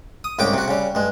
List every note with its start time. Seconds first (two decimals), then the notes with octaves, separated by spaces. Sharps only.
0.24 D#6
0.39 C2 G#2 C#3 G5 D6
0.54 C3 F#4
0.68 C#3 G3
0.95 G2 G#3